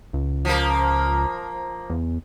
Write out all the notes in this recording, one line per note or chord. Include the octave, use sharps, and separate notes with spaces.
C#2
F3 A#3
E2